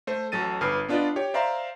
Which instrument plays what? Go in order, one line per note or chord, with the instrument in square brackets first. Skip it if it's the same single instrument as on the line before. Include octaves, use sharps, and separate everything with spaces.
[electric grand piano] A3 C5
A1 F#3 A4 A6 D#7
G1 B4 D6 F6 C7
B3 D4 F4 B4 D5 D#5
G4 C#5
C5 D5 E5 F5 A#5 C6